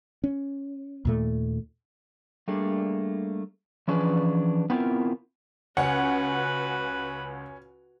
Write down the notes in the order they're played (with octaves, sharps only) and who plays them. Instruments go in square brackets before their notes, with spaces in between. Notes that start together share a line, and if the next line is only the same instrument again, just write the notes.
[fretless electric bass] C#4
D#2 A#2 A3
[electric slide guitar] G3 A3 A#3 D4 G#4
E3 F3 C#4 D4 G#4 B4
B3 C4 E4 F4 A#4
[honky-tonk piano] C#2 F#5 [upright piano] C#4 [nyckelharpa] F#4 B4